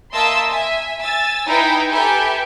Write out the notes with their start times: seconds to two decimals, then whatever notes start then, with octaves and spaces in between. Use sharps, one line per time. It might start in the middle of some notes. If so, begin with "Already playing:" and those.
0.12 A#3 D#5 E5 A5 C6 E6
0.49 E5 G#5
1.01 G#5 E6 A6
1.46 D#4 E4 B4 G5 G#5 A#5
1.91 G4 A4 B4 E5 G5 G#5